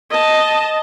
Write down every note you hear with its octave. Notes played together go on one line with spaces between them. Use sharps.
D#5 A5